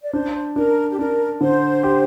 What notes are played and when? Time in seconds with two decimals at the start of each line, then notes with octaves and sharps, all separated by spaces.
0.03 D5
0.13 D4 C5
0.56 D4 A#4
0.90 G4
0.99 D4 A#4
1.41 D3 C5
1.83 G4